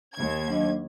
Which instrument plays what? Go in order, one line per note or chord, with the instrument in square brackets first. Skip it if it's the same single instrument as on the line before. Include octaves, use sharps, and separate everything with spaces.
[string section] D#2 G#6
[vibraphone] F#3 D4 D#5